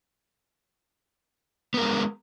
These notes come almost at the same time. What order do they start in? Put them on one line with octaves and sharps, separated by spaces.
B3 A#4 G#3